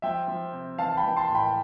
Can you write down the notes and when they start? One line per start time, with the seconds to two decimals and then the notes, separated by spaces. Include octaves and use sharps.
0.02 F3 E5 G5
0.28 F3
0.53 C3
0.78 E3 F5 A5
0.89 A5
0.97 G5 B5
1.04 E3
1.16 A5 C6
1.29 A2
1.35 G5 B5